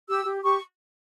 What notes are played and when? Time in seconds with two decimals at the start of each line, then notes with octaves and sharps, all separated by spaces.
0.08 G4 E6
0.25 G4
0.43 G4 C#6